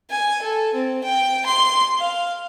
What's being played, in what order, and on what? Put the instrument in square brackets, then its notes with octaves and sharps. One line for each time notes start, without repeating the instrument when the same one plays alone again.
[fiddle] G#5
A4
C4
G5
C6
F5